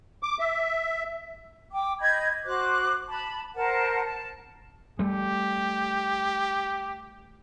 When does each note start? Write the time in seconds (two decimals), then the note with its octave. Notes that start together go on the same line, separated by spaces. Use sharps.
0.23 D6
0.39 E5
1.71 G5 D6
2.00 D#5 B5 G6 G#6
2.45 F#4 C5 D6 F#6
3.08 A5 B5
3.56 A#4 C5 F#5 A5
4.04 A5
4.99 G3 A3 G4